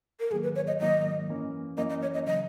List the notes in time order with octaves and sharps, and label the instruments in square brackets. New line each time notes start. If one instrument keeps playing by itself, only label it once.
[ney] A#4
[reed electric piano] G#2 D#3 F#3 A#3 [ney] G#4
[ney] B4
C#5
D#5
[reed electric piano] G#2 D#3 F#3 A#3 [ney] D#5
[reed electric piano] F#2 E3 A#3 C#4
[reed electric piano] F#2 E3 A#3 C#4 [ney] D#5
[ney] D#5
C#5
D#5
[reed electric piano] C#3 F#3 [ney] D#5